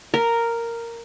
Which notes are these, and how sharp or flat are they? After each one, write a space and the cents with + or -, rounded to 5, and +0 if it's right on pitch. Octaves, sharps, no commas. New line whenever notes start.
A#4 -5